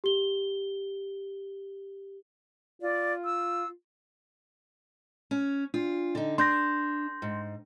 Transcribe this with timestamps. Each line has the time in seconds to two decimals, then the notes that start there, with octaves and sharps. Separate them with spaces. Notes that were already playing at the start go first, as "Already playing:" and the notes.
0.04 G4 G7
2.82 F4 D5
3.25 E6
5.31 C#4
5.74 D4 F4
6.15 D3 D#4
6.38 D4 C6 G6 A#6
7.22 G#2